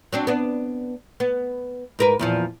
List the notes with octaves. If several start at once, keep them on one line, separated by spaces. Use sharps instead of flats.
F#3 C4 D4
B3 D4
B3
G#2 A#4 B4
E2 A#2 F3